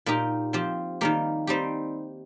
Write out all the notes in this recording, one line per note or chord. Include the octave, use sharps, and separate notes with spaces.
A#2 A#3 D#4 G4 A#4
F3 C4 G4
D#3 G3 A#3 G4
G3 C4 D#4 G4